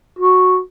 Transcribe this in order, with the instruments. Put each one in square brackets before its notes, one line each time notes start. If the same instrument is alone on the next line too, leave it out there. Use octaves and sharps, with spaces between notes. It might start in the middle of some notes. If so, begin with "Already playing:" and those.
[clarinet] F#4